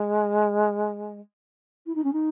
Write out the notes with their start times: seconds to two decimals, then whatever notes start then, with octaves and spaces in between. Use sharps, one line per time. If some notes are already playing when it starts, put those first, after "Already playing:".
Already playing: G#3
1.86 E4
1.95 D#4
2.04 C#4
2.13 D#4